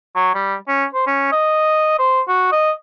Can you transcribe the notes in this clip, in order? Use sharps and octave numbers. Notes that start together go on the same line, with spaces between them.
F#3
G3
C#4
C5
C#4
D#5
C5
F#4
D#5